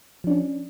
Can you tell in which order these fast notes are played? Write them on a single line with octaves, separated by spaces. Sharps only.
F3 D4 C#4